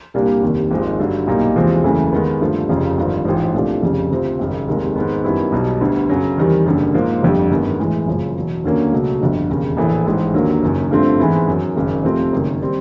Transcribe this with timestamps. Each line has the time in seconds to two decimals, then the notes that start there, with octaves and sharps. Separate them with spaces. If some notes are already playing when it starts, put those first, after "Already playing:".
0.14 C2 A#2 G3 A#3 D4
0.43 F1 D#2 D#3
0.71 G#1 G#2 F3 G#3
1.00 G2 D3 F#3
1.27 B1 A#2 G3 A#3 D#4
1.56 E2 C3 F3 G#3
1.84 F#1 E2 C#3 E3 A3
2.12 D#2 D#3 G#3 B3
2.41 G2 D3 F3 A3
2.69 F1 F2 C#3 F3
2.98 G#1 G2 D3 F3
3.25 A1 G#2 F3
3.54 C2 A#2 F3 A3 D4
3.83 F1 F2 C#3
4.11 D2 C3 F3
4.39 G#1 F#2 C#3
4.68 F1 D#2 D#3 G#3
4.96 G#2 D#3 G#3 B3
5.24 F#2 D#3 G3 B3 E4
5.52 B1 B2 G3
5.81 D2 D3 G3 B3
6.09 F#2 C#3 F#3
6.38 E2 C3 D#3 G3
6.66 F#1 F#2 D3 G3
6.94 G#2 F3 A#3
7.22 G1 F2 D3 G3
7.50 G1 F#2 D#3 G#3 B3
7.79 A2 E3 G#3
8.07 F#1 F#2 C#3 F3
8.36 E2 B2 F#3
8.64 D#2 D3 F#3 A#3 C#4
8.92 C#2 B2 F#3 A3
9.21 G1 F2 D3
9.49 E1 D#2 C#3
9.77 A#1 A2 E3 A3
10.06 A1 G#2 E3 G#3
10.34 D#2 D3 F#3 A#3
10.62 F#1 F#2 D#3
10.91 G2 D3 F3 A3 C4
11.19 G#2 E3 G#3 B3 E4
11.47 F#2 D#3 F#3
11.76 G#1 F#2 C#3
12.04 F2 C3 F3 A3 C4
12.33 F#1 F#2 D#3
12.62 D#3 G3 C4